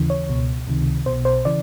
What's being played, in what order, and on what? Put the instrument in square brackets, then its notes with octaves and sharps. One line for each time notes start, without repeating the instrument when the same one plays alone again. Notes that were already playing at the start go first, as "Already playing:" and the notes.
Already playing: [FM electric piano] D#2 C#3 E3
C#5
C#2 B2
C#2 C3 D#3
B1 B2 C5
C5
C#3 E3 D5